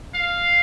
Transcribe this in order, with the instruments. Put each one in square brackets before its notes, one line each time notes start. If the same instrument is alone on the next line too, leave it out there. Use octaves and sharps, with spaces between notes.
[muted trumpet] F5